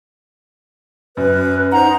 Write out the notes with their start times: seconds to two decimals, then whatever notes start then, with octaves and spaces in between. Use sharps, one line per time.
1.17 F#2 B4
1.72 D#4 C5 F#5 A#5